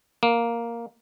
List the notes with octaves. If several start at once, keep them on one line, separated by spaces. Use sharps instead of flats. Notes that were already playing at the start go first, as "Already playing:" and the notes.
A#3